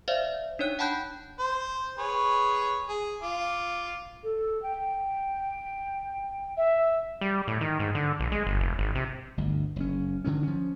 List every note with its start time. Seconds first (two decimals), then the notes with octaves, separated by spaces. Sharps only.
0.08 C5 D5 E5 F5
0.59 D4 D#4 C#5 F#6
0.79 F#5 G5 A5 B5 F#6 G6
1.39 C5
1.98 G#4 B4 C#5
2.89 G#4
3.23 F4 D6
4.24 A4
4.63 G5
6.57 E5
7.21 G3
7.47 A2
7.61 D#3
7.79 G#2
7.95 D3
8.19 A#1
8.32 G#3
8.47 G1
8.60 F1
8.79 G#1
8.95 C3
9.37 G1 D2
9.76 F#1 C#4
10.24 D3 D#3 F#3 C#4
10.43 F3 C#4